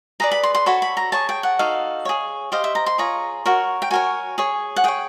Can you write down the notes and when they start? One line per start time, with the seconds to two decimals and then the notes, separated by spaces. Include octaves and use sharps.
0.20 G#4 B4 D5 A#5
0.31 B5
0.43 C6
0.55 C6
0.66 F#4 A4 C#5 B5
0.82 B5
0.97 A#5
1.12 G#4 C#5 A5
1.29 G5
1.43 F#5
1.59 D#4 F#4 A4 F5
2.05 G#4 C#5
2.52 G4 C5 D#5 F5
2.64 E5
2.75 A#5
2.86 C6
2.98 F4 G#4 C#5 A#5
3.46 F#4 A#4 C#5
3.82 G5
3.91 F#4 A#4 C#5 G#5
4.38 G#4 C#5
4.76 F#5
4.84 G#4 C#5 G5